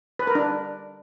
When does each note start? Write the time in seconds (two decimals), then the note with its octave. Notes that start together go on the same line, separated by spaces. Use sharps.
0.19 B4
0.27 A#4
0.35 D4